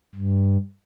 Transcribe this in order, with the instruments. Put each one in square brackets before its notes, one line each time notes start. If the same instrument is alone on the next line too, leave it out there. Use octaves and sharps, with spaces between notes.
[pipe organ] G2